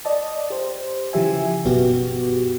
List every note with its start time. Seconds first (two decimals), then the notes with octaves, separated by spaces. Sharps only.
0.05 D5 D#5 A5
0.50 G4 C5
1.13 C#3 E3 F3 G4 E5 G#5
1.65 G1 F#2 B2 B3 F#4 G4